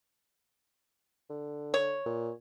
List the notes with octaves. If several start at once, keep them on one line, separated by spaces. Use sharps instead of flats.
D3
C#5
A#2